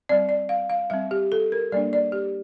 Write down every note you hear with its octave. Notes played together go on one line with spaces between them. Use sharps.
G3 C4 D5
D5
F5
F5
G3 C4 E5
G4
A4
A#4
G3 A#3 D4 D5
D5
G4